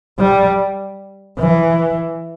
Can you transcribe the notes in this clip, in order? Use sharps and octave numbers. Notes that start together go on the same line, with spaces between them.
G3
E3